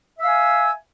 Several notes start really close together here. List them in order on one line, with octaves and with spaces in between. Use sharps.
E5 E6 F5 G#5